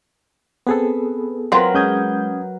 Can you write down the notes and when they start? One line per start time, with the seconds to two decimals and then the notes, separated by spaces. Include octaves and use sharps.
0.67 B3 C4 G#4 A4 B4
1.52 F#3 C4 F4 A#4 B4
1.75 G#3 C#4 D#6 G6 G#6